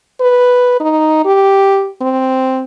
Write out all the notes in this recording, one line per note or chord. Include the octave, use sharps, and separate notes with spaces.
B4
D#4
G4
C4